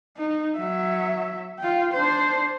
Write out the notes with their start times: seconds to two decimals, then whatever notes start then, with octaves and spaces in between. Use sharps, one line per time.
0.17 D#4
0.56 F#3 E5
1.59 F4 G5
1.94 D4 C5